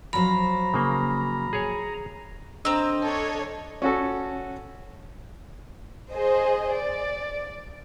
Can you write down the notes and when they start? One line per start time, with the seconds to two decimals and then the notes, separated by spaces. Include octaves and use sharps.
0.13 F3 F#3 C5 A#5 B5
0.74 C#3 A#3
1.53 G#4 C#5 G#5
2.65 D3 C4 D#5 A#5 E6
3.02 D4 A4 C#5
3.82 C#4 F#4 A4
6.12 G#4 C5 D#5
6.73 D5